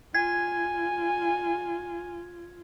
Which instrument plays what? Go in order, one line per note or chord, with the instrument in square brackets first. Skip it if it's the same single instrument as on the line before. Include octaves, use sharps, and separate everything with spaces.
[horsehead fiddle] F4 [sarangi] G#5 [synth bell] G#6